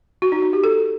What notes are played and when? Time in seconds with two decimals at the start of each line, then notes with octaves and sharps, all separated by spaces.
0.22 F#4
0.32 D#4
0.42 D#4
0.53 G4
0.64 A4